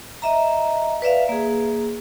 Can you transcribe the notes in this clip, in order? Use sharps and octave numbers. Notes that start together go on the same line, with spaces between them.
D#5 E5 A#5
B4 D5 E5 F5
A#3 G#4